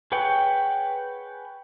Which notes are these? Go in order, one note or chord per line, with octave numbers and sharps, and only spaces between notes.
G#4 B4 C#5 F#5 G5